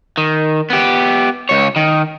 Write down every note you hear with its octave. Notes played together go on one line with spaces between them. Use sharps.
D#3
B3 G4
C#2 C#5
D#3